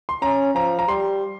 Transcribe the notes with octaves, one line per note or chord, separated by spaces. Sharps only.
C6
C#4 A#5
F3 A#5
A#5
G3 C6